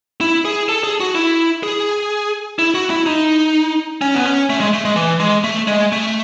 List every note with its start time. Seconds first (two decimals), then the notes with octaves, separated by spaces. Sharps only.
0.21 E4
0.45 G#4
0.69 A4
0.83 G#4
1.00 F#4
1.15 E4
1.63 G#4
2.59 E4
2.75 F#4
2.90 E4
3.06 D#4
4.02 C#4
4.14 B3
4.25 C#4
4.50 A3
4.60 G#3
4.73 A3
4.85 G#3
4.96 E3
5.20 G#3
5.44 A3
5.67 G#3
5.92 A3